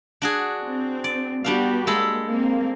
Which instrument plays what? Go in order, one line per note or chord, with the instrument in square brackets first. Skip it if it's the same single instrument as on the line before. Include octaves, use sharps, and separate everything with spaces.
[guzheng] D4 F#4 G#4
[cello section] C4
[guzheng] D5
[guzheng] G3 D4 F5 [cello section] B3 F#4 G4
[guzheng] G#3 A4 B5 [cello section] A#3
[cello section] A#3 C4